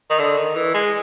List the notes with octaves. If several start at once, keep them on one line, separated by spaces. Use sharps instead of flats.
D#3
D3
D#3
E3
G#3